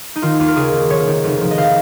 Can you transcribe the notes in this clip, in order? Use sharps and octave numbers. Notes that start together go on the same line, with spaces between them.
D#4
D#3 F4
D#2 F4
A#4
C#3 G#4
C#3
F1 C#5
D#3
F1
F3
D#5
D#3 F5